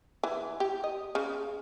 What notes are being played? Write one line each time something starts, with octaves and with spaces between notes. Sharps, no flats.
E3
G4
D#5
C#3